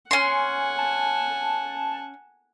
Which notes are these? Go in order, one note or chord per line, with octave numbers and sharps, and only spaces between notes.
C#4 F#5 G#5 C6
A5